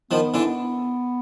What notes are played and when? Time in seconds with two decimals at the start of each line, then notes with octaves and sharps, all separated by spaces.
0.11 D#3 F3 B3
0.34 D3 E3
0.45 B3